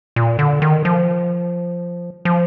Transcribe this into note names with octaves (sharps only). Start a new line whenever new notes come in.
A#2
D3
D#3
F3
F3